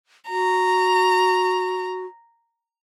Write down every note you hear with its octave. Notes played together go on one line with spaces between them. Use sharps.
F#4 A#5